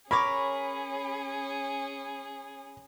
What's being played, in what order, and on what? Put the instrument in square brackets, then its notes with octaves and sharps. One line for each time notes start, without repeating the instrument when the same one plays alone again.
[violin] C#4 G#4 [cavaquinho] A#4 C#5 D6 [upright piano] B5